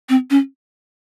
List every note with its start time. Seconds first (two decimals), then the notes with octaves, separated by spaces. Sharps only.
0.09 C4
0.30 C#4